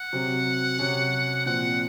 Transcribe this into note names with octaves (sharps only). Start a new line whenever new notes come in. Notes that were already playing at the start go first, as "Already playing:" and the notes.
Already playing: F#5
C3 F#3 C4
C3 F#3 C#4
A#2 F3 C4 F#5